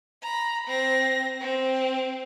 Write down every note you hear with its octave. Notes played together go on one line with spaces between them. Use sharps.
A#5 B5
C4 A#6
C4